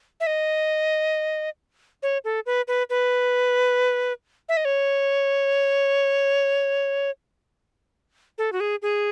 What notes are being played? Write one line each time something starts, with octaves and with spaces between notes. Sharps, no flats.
E5
D#5
C#5
A4
B4
B4
B4
E5
D#5
C#5
A4
F#4
G#4
G#4